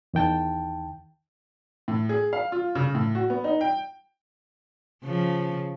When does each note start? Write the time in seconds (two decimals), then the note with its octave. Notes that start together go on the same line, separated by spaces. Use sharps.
0.14 E2 D#3 G5 A5
1.88 A2
2.09 G#4
2.33 F5
2.52 F4
2.75 C#3
2.95 A2
3.15 F#4
3.30 B3
3.44 D#4
3.61 G5
5.03 C#3 F3